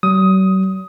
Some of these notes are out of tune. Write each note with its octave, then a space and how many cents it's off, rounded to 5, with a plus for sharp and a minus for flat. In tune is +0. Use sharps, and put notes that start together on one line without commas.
F#3 +45 D#6 +15